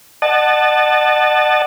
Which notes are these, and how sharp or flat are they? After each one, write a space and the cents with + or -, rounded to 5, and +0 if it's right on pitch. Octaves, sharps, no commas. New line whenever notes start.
D#5 -40 F#5 +10 A5 -10